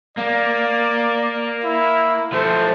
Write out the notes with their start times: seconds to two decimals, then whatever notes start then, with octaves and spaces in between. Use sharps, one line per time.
0.17 A#3 D5
1.64 E4
2.32 F3 A3 C5